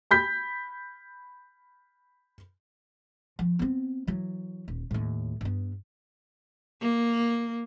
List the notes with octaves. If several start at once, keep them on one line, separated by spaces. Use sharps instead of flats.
B5 G6 B6
F3
B3 C4
E3 F#3
D#1
D#2 A2
G2 B3
A#3